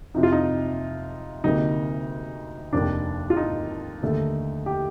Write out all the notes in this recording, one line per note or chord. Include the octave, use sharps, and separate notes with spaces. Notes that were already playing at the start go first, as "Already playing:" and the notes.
F2 C3 F3 D#4
F4
D#4
D2 C3 G3 A#3 D#4
F1 D#2 D#3 D4
F4
D#4
D#2 D3 A3
G4